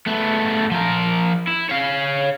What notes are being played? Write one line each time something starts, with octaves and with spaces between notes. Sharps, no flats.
A3 B3
F3 A#4
E4
C#5 F5